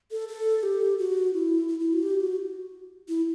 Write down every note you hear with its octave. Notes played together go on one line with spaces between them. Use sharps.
A4
A4
G4
F#4
E4
E4
E4
F#4
G4
F#4
E4